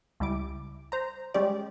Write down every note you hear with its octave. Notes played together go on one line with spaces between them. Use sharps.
C#2 G3 E4 D6
C5 A#5
G3 G#3 C#4 G4 D5